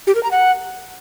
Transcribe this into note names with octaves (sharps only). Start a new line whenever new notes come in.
G4
A#4
A#5
F#5